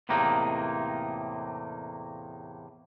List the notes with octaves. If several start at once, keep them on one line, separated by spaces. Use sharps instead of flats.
E2 A2 C3 A#3 D#4